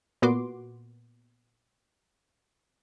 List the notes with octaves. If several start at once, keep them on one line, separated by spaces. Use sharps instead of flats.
A#2 B3 F#4 C6 D6